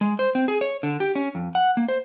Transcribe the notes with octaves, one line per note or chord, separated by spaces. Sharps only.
G#3
C5
C4
G#4
C#5
D3
G4
C#4
F2
F#5
A#3
C5